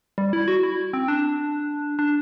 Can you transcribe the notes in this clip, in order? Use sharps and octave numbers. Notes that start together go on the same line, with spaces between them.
G3
E4
F#4
E4
C4
D4
D4